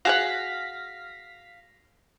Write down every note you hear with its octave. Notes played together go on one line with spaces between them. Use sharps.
F#4 G#4 F5 F#5 A#6 B6